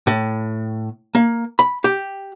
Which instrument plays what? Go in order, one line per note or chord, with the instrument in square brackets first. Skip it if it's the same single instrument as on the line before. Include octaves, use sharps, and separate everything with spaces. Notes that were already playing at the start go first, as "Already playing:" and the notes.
[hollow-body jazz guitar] A2
A#3
B5
G4